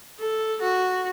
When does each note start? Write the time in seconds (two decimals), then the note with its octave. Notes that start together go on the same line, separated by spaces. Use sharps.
0.20 A4
0.61 F#4